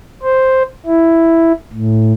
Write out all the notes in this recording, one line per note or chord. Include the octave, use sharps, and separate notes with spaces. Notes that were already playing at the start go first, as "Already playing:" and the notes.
C5
E4
A2